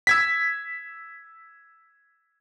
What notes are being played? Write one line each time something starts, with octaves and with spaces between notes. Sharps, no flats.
E6 G#6 B6